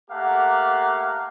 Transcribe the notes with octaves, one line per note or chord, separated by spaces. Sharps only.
A3 A#3 G4 A#4 F5 F#5